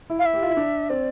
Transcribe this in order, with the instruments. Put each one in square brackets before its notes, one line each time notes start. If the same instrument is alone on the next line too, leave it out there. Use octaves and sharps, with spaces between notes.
[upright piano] E4
[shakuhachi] F5
E5
[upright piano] G4
F4
E4
D4
[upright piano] C4 [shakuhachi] D5